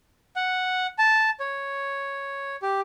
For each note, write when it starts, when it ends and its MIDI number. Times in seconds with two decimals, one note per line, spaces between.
0.36 0.87 78
0.98 1.30 81
1.40 2.56 73
2.62 2.81 67